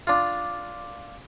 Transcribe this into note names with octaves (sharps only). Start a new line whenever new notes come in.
D4 F4